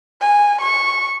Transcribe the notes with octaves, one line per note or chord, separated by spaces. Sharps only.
G#5
C#6